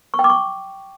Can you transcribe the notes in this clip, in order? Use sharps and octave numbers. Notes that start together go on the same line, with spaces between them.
C#6
G5
D6
C#6